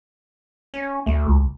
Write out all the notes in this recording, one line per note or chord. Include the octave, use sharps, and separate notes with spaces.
C#4
D2 A3
C#2